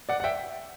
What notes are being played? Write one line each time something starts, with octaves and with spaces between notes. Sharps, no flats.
D5 F#5
F#5
E5 G5